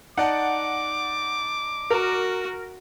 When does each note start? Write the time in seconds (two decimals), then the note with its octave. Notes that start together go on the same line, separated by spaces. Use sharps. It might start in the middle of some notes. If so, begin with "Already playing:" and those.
0.17 D#4 D5 F#5 A5 D6
1.90 F#4 A#4